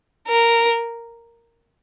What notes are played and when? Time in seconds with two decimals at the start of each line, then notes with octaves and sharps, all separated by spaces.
0.28 A#4